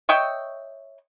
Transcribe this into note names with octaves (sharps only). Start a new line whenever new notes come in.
C#5 D#5 E5 G5